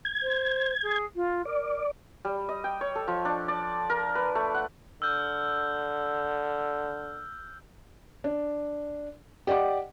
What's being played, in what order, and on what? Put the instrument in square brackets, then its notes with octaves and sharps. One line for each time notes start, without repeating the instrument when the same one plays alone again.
[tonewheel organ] G#6
[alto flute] C5
G#4
F4
[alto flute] A#4 [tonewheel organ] D5
[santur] G3
D#5
G5
C#5
A4
F3
D4
D5
A#4
B4
A3
F#5
[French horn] D3 [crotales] E6 F6 G6
[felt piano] D4
G4 D5 D#5 F#5 D6